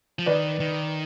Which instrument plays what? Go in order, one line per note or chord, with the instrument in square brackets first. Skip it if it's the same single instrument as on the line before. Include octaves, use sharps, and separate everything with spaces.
[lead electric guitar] F3
[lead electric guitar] D#3 [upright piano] B4 D5
[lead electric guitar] D#3